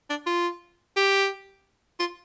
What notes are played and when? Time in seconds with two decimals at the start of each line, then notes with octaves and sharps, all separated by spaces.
0.10 D4
0.27 F4
0.97 G4
2.00 F4